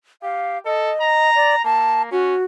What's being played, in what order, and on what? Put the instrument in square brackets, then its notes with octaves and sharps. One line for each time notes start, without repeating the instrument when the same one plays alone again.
[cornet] G4 [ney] F5
[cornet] A4 [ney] D#5
[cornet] A#5
[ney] D5
[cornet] A#3 [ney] A5
[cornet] C#4 [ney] F#4